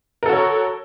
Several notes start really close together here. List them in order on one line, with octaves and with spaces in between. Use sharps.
A#4 A4 F#4 C#5